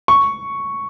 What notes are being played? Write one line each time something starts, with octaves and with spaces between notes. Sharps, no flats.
C#6